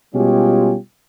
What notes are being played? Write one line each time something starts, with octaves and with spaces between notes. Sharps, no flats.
B2 G3 G#3 C#4 F4 G4